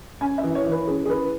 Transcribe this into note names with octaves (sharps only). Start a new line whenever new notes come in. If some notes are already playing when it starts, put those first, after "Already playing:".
C#4 G#5
E5
E3
C#5
E3
B4
C#4 G#4
G#4
E3 B4